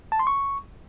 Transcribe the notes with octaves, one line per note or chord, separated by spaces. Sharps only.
A5
C6
C#6